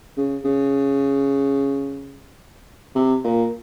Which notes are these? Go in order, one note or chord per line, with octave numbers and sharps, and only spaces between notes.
C#3
C#3
C3
A#2